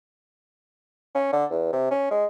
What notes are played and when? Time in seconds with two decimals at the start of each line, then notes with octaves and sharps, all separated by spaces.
1.15 C#4
1.32 D3
1.50 E2
1.72 C3
1.91 C#4
2.11 G#3